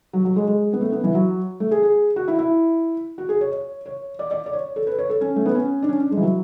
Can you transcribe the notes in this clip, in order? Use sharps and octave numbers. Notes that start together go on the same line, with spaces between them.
F#3
F#3
G#3
G#3
B3
A3
B3
E3
F#3
A3
G#4
G#4
F#4
E4
E4
F#4
G#4
C#5
C#5
C#5
D5
D5
D5
C#5
A4
B4
C#5
A4
C#4
A3
B3
C#4
D4
C#4
D4
G#3
E3
F#3